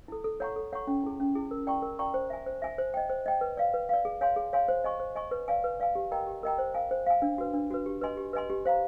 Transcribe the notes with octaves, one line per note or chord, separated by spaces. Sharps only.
E4 A4
A4
C#5 F#5 A#5 C#6
A4
C#5 F#5 A#5 C#6
C#4
E4 G#4
C#4
E4 G#4
A#4
D5 G5 A#5 C#6
A#4
D5 G5 A#5 C#6
C5
E5 G#5
C5
E5 G#5
C5
D#5 G5
C5
D#5 G5
B4
D5 F5
B4
D5 F5
G#4
C#5 F5 G#5 C6
G#4
C#5 F5 G#5 C6
C5
D#5 G#5 C#6
C5
D#5 G#5 C#6
B4
D5 F5 G#5
B4
D5 F5 G#5
G4
A#4 D#5 G5 A#5
G4
A#4 D#5 G5 A#5
C5
F5 G#5
C5
F5 G#5
D4
F#4 B4
D4
F#4 B4
G4
B4 D#5 G#5 C6
G4
B4 D#5 G#5 C6
G4
C5 F5 A#5